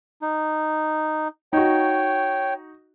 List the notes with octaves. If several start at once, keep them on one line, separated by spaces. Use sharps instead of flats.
D#4
D#4 F#4 C#5 G5